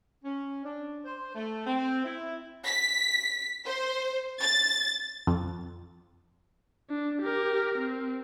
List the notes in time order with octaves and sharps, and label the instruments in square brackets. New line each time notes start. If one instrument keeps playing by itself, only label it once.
[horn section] C#4
D4
C5
A3
C4
E4
[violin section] B6
C5
A6
[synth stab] F2
[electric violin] D4
G4 A#4
C4